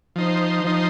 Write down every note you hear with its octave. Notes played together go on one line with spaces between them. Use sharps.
F3 D#4 C5
F3 D#4 C5